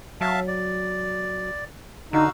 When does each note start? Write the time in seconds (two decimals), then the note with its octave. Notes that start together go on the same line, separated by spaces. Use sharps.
0.21 F#3 E5 F5 A5
0.48 D5
2.13 D3 D#4 F#4 F5 E6